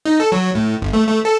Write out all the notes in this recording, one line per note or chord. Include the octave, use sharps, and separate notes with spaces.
D#4
A4
F#3
A2
G1
A3
A3
A4